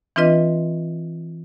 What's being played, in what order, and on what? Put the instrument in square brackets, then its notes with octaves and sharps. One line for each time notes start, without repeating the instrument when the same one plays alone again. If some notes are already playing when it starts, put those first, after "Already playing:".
[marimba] E3 C4 D4 F4 B4 D#5